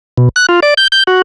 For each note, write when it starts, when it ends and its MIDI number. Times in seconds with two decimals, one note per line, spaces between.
0.18 0.29 47
0.36 0.46 90
0.49 0.60 65
0.63 0.74 74
0.77 0.87 91
0.92 1.03 91
1.07 1.22 66